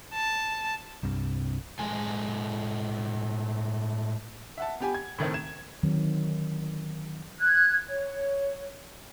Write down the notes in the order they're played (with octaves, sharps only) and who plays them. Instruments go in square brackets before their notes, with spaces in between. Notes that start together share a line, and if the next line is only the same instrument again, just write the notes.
[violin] A5
[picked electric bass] C2 G2 C3
[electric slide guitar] A2 G#3 A3 A4 G#5
[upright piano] E5 F#5 A5
B3 G4 G#5
G#6
A2 D#3 A3 C4
G#6 E7
[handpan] D3 D#3 F#3 C4
[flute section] F#6 G#6
C#5